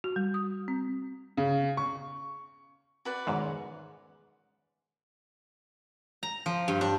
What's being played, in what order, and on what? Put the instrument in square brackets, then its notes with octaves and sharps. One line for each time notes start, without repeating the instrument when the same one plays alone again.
[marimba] F#4
G3
D#6
C4
[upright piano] C#3
C#6
[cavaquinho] F#4 B4 D5
[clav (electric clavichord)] E2 G#2 B2 [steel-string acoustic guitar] D#3 G#3 C#4
[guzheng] A#5
F3
G2
D4